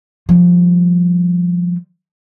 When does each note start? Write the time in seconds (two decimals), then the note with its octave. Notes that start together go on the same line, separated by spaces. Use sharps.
0.29 F3 G3